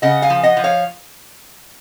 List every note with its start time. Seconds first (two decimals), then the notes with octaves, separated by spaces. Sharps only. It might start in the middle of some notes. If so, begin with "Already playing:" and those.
0.02 C#3 D#5 F#5
0.22 F5 G#5
0.30 F3
0.43 D#5 F#5
0.57 F3
0.64 C#5 F5